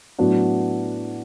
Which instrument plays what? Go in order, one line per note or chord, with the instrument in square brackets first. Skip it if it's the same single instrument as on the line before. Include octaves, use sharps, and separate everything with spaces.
[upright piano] A2 F#3 B3 D4 F#4